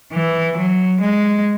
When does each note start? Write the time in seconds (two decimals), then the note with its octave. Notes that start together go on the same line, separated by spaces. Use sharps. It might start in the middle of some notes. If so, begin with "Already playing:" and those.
0.13 E3
0.57 F#3
1.01 G#3